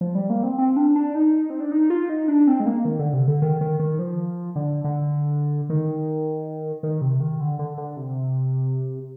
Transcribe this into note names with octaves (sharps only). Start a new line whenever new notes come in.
F3
G3
A#3
C4
C4
D4
D4
D#4
C4
D4
D#4
F4
D#4
D4
C4
G#3
A#3
D#3
D3
C3
D3
D#3
D#3
D#3
F3
D3
D3
D#3
D#3
C3
D#3
D3
D3
D3
C3